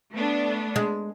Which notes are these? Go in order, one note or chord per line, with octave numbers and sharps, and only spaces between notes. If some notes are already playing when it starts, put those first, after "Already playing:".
A3 B3 D4
G#3